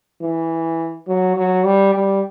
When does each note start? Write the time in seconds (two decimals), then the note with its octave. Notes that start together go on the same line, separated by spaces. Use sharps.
0.21 E3
1.07 F#3
1.36 F#3
1.65 G3
1.95 G3